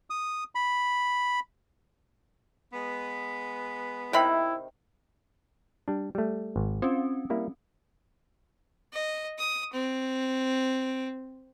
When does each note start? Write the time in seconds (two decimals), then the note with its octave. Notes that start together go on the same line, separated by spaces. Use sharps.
0.10 D#6
0.55 B5
2.73 G#3 B3
4.13 C3 D#3 E4 C5 E5 G5 B5
5.88 G3 D4
6.15 G3 A3
6.56 G#1
6.82 C4 C#4 F4 C5
7.30 G3 A#3 E4
8.93 D#5
9.38 D#6
9.73 C4